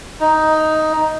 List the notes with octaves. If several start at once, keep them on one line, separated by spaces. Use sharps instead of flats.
D#4